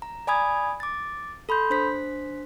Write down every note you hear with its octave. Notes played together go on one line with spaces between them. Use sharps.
A#5
D5 G#5 B5 D#6 G#6
D6 A6
A4 B5 C6 G6
D4 C5 B6